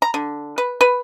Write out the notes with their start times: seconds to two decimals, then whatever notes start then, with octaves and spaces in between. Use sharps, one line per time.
0.02 A#5
0.14 D3
0.58 B4
0.81 B4